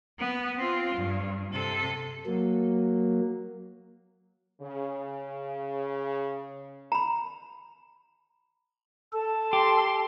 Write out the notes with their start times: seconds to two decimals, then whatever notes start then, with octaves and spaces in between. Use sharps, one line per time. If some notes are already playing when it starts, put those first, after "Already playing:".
0.19 B3
0.57 C4 F4
0.96 G2
1.52 C3 A4
2.26 F#3 A#3
4.61 C#3
6.92 A#5 B5
9.13 A4 A5
9.53 G4 C6